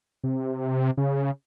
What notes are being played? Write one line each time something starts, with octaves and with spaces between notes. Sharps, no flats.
C3
C#3